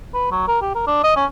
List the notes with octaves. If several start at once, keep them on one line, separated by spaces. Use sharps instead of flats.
B4
F#3
A#4
G4
A#4
D4
D#5
C#4